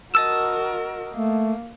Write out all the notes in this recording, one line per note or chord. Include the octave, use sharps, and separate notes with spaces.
F#4 A#4 D#5 A5 E6
A3 A#3